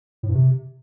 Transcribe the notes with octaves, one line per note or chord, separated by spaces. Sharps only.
A2
G2
C3